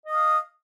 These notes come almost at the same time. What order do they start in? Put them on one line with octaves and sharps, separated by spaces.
D#5 D#6 F5